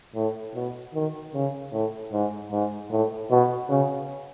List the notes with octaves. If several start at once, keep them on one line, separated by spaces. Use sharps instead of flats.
A2
B2
D#3
C#3
A2
G#2
G#2
A2
B2
C#3